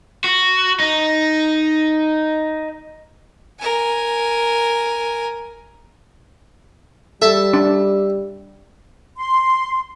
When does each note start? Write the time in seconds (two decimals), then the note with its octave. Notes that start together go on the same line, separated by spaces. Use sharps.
0.24 F#4
0.80 D#4
3.60 A#4 G#5
7.22 G3 A4 E5 A5
7.53 D4
9.16 C6